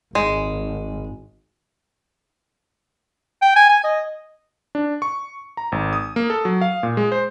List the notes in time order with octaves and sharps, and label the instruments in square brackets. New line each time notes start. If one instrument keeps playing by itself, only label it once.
[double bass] G#1 [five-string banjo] G#3
[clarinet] G5
G#5
G#5
D#5
[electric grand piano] D4
C#6
A#5
G#1
D#6
A#3
A4
F#3
F5
A#2
G#3
C5